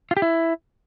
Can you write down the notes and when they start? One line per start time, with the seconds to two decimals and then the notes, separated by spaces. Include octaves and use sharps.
0.11 F4
0.17 G4
0.22 E4